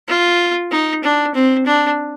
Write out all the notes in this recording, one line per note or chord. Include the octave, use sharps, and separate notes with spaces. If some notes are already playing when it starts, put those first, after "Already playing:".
F4
D#4
D4
C4
D4